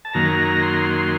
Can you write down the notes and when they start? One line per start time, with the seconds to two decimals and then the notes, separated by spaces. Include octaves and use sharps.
0.05 A5
0.14 F#2 D#3 F#3 A#3 A#5
0.62 C6
0.74 A#5
0.78 C6
0.94 C6